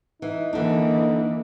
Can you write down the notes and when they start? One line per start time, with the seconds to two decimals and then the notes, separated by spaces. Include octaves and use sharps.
0.22 E3 D#4
0.53 D3 E3 A#3 D4